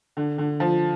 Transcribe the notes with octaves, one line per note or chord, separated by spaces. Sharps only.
D3
D3
F3